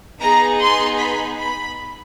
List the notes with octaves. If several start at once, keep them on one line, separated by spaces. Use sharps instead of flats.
B3 D#4 G#4 A#5
C6
B5
B5